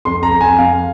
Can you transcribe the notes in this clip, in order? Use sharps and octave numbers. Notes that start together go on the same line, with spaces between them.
F2 C6
A#5
F2
G#5
F2 F5